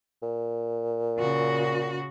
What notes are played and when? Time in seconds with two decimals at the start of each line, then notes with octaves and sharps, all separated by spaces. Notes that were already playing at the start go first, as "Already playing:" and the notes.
0.22 A#2
1.18 C#3 F#4